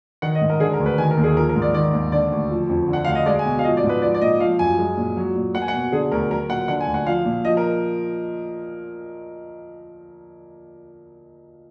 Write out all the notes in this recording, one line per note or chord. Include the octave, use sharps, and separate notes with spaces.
D#3 F#5
D#5
G#2
A#4
D3 G#4
A#4
D2
B4
D#3 G#5
A#4
D#2
G#4
F3 A#4
A#4
G#2
D5
D#3 D5
D#2
D3 D5
D2
F3
F2
D3
F#5
D2 F5
D#5
G#3 D5
G#5
B2
F5
F3 D#5
D5
G#2
B4
F3 D5
D5
A#2 D#5
F3 F5
F#2 G#5
G#3
A#2
F#3
A#2
A#3 F#5
G#5
F#5
B2
D3 G#4
D2 A#4
F#3 A#4
A#2 F#5
D3 F#5
G#5
D2
F#5
F3 F5
A#2
F3 D#5
A#4